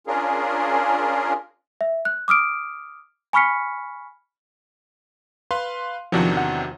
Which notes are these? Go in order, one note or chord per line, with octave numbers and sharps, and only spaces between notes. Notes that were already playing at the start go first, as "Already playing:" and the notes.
C#4 D4 F4 G#4 A#4
E5
F#6
D6 D#6 F6 D7
G#5 B5 C#6 F6 B6 C#7
B4 F5 C6
E2 C3 D#3 F3 F#3 D4 F#4
F#5